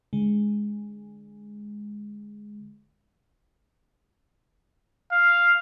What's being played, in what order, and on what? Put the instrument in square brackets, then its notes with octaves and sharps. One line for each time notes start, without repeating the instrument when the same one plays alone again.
[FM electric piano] D3 G#3
[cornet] F5